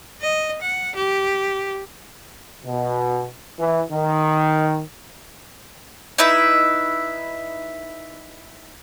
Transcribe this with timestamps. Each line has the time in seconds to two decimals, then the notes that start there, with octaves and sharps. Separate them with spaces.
0.22 D#5
0.62 F#5
0.96 G4
2.65 B2
3.59 E3
3.92 D#3
6.18 D#4 E4 B4 E5